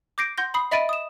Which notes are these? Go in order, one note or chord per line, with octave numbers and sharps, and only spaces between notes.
D6 G6 A#6 C7 D7
F#5 C6 G6 A#6
B5 D#6 C7
D#5 E5 B5 A6 D7 D#7
D#6 E7